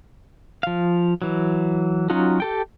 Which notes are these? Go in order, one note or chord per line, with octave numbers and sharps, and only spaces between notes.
F3 F5
E3 F#3
F#3 C#4 D#4 F4 F#4
G4 A4 G5